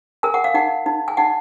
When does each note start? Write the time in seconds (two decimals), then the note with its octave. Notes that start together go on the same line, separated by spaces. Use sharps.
0.23 A#4 G#5
0.34 F#5
0.44 F5
0.54 D#4 F#5
0.86 D#4
1.08 G#5
1.17 D#4 F#5